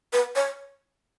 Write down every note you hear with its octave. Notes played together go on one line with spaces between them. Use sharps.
B4
C#5